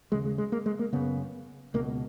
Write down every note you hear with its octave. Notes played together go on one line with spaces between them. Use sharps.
D#2 C#3 G#3
G#3
G#3
A#3
G#3
A#3
F#2 C#3 B3
C#2 B2 A#3